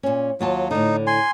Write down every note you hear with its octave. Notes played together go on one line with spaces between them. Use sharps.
A#2 C#4
D#2 F#3 F4 A5
A2 D3 D#4
G#5 C6